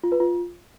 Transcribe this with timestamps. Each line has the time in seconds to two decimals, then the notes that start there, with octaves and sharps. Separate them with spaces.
0.04 F4
0.12 B4
0.20 F4